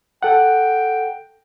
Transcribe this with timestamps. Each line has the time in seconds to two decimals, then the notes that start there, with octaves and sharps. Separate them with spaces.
0.23 A4 F#5 G5